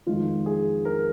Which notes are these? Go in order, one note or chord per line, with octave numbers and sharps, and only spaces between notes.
F2 D#3 G#3 F4
G#4
A#4